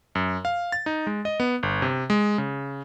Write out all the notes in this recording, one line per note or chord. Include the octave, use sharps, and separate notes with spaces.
F#2
F5
A6
D#4
G#3
D#5
B3
G1
C3
G#3
C#3